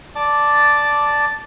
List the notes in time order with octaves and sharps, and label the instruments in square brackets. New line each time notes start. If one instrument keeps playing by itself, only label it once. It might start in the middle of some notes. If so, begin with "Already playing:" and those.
[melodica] D5 A5 D6